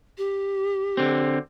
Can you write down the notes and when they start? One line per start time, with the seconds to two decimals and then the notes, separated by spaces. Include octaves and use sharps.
0.17 G4
0.97 D3 C4